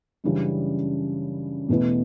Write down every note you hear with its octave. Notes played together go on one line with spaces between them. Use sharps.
F#2 C#3 E3 G3 D4
E2 B2 A3 E4 B4